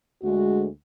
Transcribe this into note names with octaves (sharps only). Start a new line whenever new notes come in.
D2 G#3 F#4